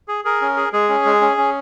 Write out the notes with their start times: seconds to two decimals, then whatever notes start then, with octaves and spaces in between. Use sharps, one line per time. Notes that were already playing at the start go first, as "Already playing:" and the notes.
0.08 G#4
0.25 G#4 A#4
0.41 C#4
0.57 G#4
0.73 G#3 G#4
0.89 C#4
1.05 G#3
1.21 C#4
1.37 C#4